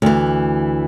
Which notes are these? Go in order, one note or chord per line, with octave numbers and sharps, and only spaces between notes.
D2 E3